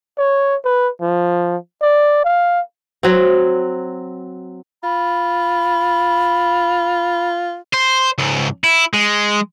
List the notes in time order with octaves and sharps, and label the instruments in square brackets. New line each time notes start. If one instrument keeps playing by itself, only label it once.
[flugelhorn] C#5
B4
F3
D5
F5
[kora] F#3 C4
[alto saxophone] F4 [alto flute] B5
[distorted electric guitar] C5
C#2 G#2
E4
G#3